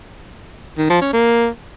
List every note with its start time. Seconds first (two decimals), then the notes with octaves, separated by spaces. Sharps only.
0.78 D#3
0.90 F3
1.02 C#4
1.13 A#3